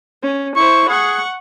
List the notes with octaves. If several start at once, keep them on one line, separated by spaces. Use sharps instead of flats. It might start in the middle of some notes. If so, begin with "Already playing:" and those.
C#4
E4 C5 C#6
G#4 F#5 C#6